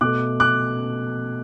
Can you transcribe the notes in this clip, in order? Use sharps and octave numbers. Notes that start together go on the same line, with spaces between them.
B2 A3 D6 F#6
D6 F#6